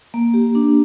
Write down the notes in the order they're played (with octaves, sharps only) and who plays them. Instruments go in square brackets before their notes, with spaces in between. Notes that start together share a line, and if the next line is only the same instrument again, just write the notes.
[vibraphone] A#3
G4
D4